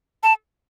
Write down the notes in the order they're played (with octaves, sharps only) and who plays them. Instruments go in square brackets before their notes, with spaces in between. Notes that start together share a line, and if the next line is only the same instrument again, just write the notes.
[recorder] A5